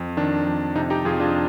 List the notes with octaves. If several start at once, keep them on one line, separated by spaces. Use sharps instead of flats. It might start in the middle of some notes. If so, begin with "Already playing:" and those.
Already playing: F2
D#3 D4
F2
C3 D#4
D#4 G4
F2 F4 G#4
D4 F4